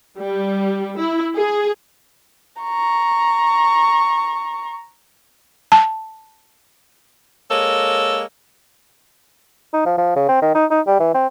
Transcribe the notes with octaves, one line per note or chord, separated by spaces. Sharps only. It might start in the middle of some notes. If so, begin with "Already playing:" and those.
G3
E4
G#4
A#5 C#6
A5
G#3 A#3 A4 C#5
D#4
F3
F3
C#3
C4
D#3
D#4
D#4
G3
E3
C4